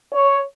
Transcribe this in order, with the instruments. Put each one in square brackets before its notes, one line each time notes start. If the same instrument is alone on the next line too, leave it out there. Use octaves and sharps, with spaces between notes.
[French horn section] C#5